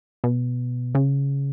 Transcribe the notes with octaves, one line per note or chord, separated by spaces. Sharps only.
B2
C#3